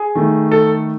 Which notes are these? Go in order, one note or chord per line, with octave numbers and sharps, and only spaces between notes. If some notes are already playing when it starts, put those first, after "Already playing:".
Already playing: G#4
D#3 A3
A4